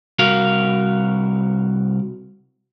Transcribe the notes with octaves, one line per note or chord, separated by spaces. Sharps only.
C2 F#4 A#4 F5